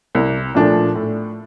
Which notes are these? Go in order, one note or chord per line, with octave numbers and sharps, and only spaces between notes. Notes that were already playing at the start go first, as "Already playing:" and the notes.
C2
A#2 F3 A3 D4
A2